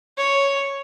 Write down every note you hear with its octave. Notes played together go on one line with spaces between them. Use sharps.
C#5